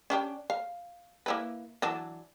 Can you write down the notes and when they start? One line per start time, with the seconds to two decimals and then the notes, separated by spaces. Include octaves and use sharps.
0.10 C#4 D4 G4
0.50 F5
1.26 A#3 E4 B4
1.82 E3 F#3 D4